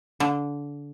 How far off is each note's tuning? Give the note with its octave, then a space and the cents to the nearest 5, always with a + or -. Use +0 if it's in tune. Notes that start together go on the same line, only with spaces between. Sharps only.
D3 -25